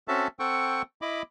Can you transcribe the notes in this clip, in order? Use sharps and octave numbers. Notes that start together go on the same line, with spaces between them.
C4 C#4 F#4 A4 E5 A5
C4 A4 F#5 G5 C#6
E4 D#5 B5 D6